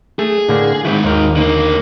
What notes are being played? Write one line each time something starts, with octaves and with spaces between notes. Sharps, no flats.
A3 G#4
A2 D3 A#3
G#2 D#3 E4
D#2 A#4
D3 A#3